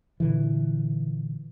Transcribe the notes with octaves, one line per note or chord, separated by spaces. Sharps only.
A#2 D3 E3